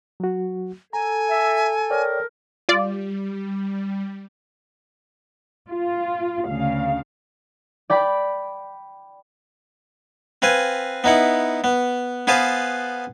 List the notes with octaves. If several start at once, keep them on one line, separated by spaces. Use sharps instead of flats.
F#3 F#4
A4 G#5 A#5
E5
A#4 C#5 D5 G5
G3 F4 D5
F4
D2 C#3 F5
D5 G5 B5
C4 B4 F5 G#5
B3 D#4 E4 F#5
B3
B3 G#4 B4 C5 F5 A5